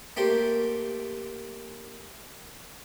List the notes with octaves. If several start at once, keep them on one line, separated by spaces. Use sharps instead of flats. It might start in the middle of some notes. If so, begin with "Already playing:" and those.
A3 A#3 G4 C5